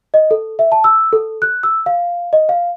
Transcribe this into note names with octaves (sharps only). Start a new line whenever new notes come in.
D#5
A4
E5
A5
E6
A4
F#6
E6
F5
D#5
F5